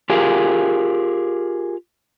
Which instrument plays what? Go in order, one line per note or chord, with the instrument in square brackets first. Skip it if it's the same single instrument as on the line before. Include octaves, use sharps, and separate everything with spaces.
[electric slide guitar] F4 G4 G#4 A#4 F5